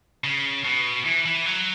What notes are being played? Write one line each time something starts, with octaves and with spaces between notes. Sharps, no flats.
C#3
B2
E3
E3
F#3